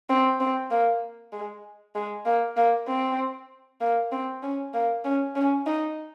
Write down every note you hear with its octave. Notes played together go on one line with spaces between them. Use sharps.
C4
C4
A#3
G#3
G#3
A#3
A#3
C4
A#3
C4
C#4
A#3
C#4
C#4
D#4